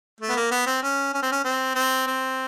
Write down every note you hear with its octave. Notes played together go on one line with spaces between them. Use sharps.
A3
B3
A#3
B3
C4
C#4
C#4
C4
C#4
C4
C4
C4